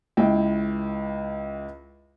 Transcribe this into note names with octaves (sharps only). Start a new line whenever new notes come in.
C#2 E4 G5